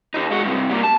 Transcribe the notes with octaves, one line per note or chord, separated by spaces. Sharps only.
D#2 D#4
G#3 F#4
G2 C3
G3 A#3
A5